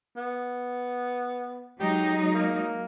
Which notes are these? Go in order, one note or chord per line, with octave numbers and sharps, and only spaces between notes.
B3
F#3 G#3 D#4 G4
A#3